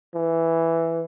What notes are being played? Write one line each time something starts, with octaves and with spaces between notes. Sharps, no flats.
E3